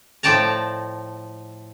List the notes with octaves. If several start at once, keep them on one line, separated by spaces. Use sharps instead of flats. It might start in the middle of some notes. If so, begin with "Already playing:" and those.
A2 F3 D5 G5 A5 A#5